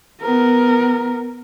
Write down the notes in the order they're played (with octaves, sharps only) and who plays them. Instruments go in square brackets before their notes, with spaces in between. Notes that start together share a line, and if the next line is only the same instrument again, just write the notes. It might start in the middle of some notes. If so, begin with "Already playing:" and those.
[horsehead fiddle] B3 A#4